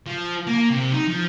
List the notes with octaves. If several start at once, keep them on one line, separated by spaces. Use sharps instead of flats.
F3
A#3
C3
D#4
F3